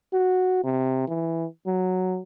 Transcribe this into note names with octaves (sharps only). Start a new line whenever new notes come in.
F#4
C3
E3
F#3